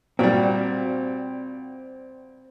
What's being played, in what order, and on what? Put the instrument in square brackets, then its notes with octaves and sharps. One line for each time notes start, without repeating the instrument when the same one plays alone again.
[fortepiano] A#2 G3 [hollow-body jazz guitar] C4 F#4